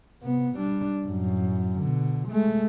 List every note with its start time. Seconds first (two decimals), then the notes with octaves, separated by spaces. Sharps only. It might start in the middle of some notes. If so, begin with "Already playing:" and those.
0.22 C3 B3
0.56 G3 D4
1.07 F#2 A2
1.78 B2 D3
2.28 G#3 A3